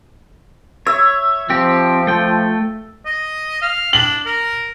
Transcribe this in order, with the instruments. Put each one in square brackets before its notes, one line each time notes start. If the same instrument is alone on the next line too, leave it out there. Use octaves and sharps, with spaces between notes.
[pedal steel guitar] C#5 [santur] E5
[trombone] F3 [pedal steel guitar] C4 G4
[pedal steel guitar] A3 G5
[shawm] D#5
F5
[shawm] D4 [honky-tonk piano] F#7
[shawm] A#4